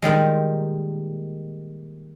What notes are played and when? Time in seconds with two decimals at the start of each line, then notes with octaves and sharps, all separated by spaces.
0.02 A#2 D#3 G3 G#3